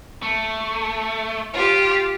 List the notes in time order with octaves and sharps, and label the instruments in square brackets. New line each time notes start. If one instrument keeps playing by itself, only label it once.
[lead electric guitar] A3
[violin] F4 G4